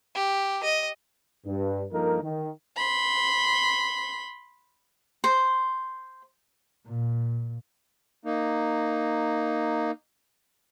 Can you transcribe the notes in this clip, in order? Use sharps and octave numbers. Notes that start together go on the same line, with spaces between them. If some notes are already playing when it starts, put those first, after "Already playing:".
G4
D#5
G2
G2 F3 A#3 D#4 A4 A#4
D#3
B5 C6
C5
A#2
A#3 D#4